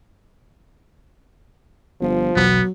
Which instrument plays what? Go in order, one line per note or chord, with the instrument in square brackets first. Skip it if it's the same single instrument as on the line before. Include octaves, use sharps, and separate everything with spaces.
[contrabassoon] G1 [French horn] F3
[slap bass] E1 B1 E3 [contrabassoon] F#3 [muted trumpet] B3